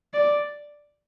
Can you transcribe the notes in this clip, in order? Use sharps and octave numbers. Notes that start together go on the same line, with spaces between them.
D5